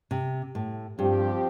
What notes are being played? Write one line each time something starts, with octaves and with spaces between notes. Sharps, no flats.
C3
A2
G2 F3 C4 G4